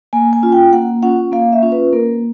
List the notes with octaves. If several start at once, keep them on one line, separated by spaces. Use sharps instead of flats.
A#3 G#5
G#5
C#4 F4
G5
A#3 F#5
C#4 F4 F#5
A#3 F5
E5
C#4 F4
B4
A#3 A#4